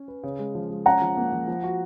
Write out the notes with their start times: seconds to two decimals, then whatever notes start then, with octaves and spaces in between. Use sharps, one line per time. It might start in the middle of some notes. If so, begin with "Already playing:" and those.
Already playing: C#4
0.08 B4
0.23 C#3
0.39 G#3
0.55 F3
0.70 G#3
0.86 C#4 F#5 A#5
1.02 F3
1.17 A#3
1.33 F3
1.47 F3
1.64 F#4